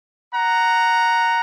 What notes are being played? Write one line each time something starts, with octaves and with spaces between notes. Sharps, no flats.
F#5 A#5